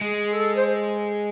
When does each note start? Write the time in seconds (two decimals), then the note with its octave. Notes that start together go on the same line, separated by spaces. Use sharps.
0.01 G#3 G#4
0.33 A4
0.56 C5